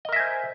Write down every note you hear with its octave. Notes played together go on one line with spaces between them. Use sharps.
A#4 C5 D#5 E5 G#5